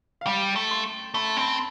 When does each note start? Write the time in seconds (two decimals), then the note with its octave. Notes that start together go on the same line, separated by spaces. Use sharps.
0.21 F5
0.26 G3 G5
0.56 A3
0.71 C6
1.14 A3 B5
1.28 A5
1.37 C4 B5